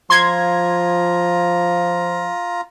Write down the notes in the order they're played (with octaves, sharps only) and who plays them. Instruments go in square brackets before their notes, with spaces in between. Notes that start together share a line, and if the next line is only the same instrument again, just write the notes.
[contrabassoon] F3 [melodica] F4 A#5 [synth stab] C6 G#6